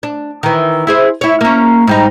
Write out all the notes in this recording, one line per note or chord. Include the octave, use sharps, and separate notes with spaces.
D4
D#3 E3
E4 G#4 C5
E4 C#5
A#3 C#4
G#2 G3 D#4